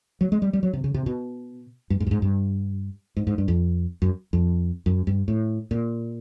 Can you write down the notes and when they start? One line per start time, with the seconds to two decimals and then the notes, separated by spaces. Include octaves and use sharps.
0.21 F#3
0.32 G#3
0.42 G3
0.53 G3
0.63 F#3
0.73 C3
0.84 C#3
0.94 C3
1.06 B2
1.90 G2
2.00 G#2
2.07 G2
2.11 G#2
2.22 G2
3.17 G#2
3.27 G#2
3.38 G2
3.48 F2
4.02 F#2
4.33 F2
4.86 F#2
5.07 G2
5.28 A2
5.71 A#2